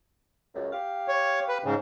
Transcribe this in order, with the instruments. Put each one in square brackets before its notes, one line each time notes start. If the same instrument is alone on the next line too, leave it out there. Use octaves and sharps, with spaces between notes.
[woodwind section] C#2 F#2
G4 F5
[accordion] C#5
B4
G#2 C#3